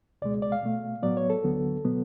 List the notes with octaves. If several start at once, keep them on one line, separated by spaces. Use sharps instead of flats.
C#2 B2 G#3 D5
D5
F5
B2 A3
A2 F#3 B3 D5
C#5
A4
D2 D3 F#3 B3
B2 F#3 B3